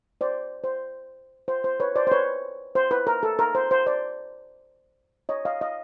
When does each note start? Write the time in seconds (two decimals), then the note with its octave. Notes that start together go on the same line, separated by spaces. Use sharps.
0.21 C5 D5
0.64 C5
1.48 C5
1.64 C5
1.80 B4 C#5
1.96 C5 D5
2.07 C5
2.11 B4 C#5
2.75 C5
2.91 B4
3.07 A#4
3.23 A4
3.39 A#4
3.55 C5
3.71 C5
3.86 C5 D5
5.29 C#5 D#5
5.45 D#5 F5
5.61 D#5 F5